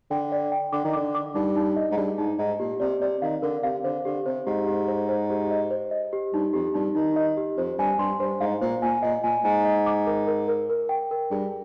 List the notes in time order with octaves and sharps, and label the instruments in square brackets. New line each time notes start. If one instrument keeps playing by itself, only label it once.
[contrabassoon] D3 [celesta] G5
[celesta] D5
G5
[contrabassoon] D3 [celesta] D6
[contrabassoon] D#3
[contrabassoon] D3 [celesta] D6
[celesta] D6
[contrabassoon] G2 [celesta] D#4
[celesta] D#4
D#5
[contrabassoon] G#2
[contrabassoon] G2 [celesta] G#4
[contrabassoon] G#2 [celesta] D#4
[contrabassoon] G#2 [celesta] D#5
[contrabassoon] A#2 [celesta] G4
[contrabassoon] C3 [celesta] D5
[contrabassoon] C3 [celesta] D5
[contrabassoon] D#3 [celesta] F5
[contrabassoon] D3 [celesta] A#4
[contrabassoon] C3 [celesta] F5
[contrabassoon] D3 [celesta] C5
[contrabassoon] D3 [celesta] G4
[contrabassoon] C3 [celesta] C5
[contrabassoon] G#2 [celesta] G4
[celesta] G4
C5
C5
G4
D#5
C5
D#5
G4
[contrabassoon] G2 [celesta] D#4
[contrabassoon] F2 [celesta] G4
[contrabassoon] G2 [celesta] D#4
[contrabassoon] D#3 [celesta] D#4
[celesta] D#5
G4
[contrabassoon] F2 [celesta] C5
[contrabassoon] G2 [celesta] G#5
[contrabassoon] G2 [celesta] C6
[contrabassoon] G2 [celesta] C5
[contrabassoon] G#2 [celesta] F5
[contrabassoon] A#2 [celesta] C5
[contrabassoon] A#2 [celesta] G#5
[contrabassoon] A#2 [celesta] D#5
[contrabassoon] A#2 [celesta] G#5
[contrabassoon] G#2 [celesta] G#5
[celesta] D#5
D6
A#4
A#4
A#4
A#4
G5
A#4
[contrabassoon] G2 [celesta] G#4